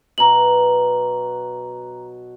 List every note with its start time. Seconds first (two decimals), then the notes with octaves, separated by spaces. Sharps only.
0.18 B2 F#3 A#5 F#7